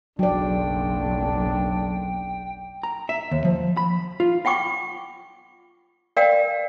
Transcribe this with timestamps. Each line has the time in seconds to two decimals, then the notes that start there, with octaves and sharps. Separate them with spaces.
0.19 F#1 B1 F#3 D4 D5 G5
2.83 A#5
3.09 E5
3.31 D#2
3.45 F3
3.77 B5
4.20 F4
4.45 F4 F#5 G5 C#6 D6
6.17 A#4 D5 F5 G5